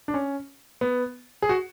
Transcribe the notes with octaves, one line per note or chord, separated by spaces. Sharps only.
D4
C#4
B3
G#4
F#4